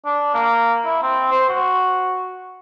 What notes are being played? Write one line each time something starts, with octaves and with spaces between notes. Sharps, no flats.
D4
A#3
E4
C4
C5
F#4